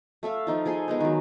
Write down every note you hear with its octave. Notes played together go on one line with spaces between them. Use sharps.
A3 A4 E5 F5
F3 D#4 F4
F3 G#4 A4 C6
G#3 B3 D#4
D#3 F#3